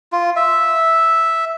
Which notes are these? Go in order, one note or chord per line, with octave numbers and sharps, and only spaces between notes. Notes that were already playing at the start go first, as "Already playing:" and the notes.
F4
E5